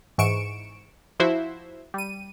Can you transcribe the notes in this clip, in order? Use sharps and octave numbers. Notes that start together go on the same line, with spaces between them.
G#2 E3 C#6 C#7 D7 E7
F3 E4 F#4 C5 E5
G3 D#7